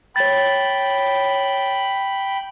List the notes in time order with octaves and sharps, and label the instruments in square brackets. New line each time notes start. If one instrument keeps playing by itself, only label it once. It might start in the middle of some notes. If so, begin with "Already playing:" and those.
[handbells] C#5 A6 [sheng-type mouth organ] G5 B5